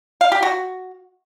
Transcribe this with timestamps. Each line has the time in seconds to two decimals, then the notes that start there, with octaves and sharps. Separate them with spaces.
0.21 F5
0.32 G4
0.43 F#4